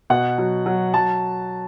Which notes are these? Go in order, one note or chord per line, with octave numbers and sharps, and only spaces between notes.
B2 F#5
F#3
F#3
F#3 A5